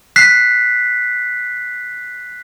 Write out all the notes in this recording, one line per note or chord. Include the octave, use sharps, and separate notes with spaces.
F#6 B6 C7